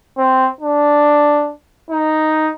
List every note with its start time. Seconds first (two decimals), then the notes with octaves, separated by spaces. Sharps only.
0.18 C4
0.61 D4
1.91 D#4